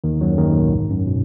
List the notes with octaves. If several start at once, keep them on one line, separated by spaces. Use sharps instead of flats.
D#2 D#3
F#2 F#3
D#2 D#3
B1 B2
G#2
F#2
B2